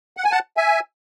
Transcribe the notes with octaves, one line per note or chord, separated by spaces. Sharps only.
F#5
G#5
F#5 A5
E5 G#5